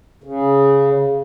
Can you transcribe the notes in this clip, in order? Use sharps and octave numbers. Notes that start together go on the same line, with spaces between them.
C#3